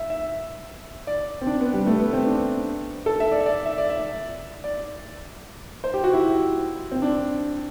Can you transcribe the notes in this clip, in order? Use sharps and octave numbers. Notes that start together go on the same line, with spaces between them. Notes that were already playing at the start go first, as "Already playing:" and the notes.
Already playing: E5
E5
D5
C4
D4
B3
G3
A3
B3
C4
D4
A4
E5
D5
E5
D5
E5
D5
E5
D5
C5
G4
F#4
E4
C4
D4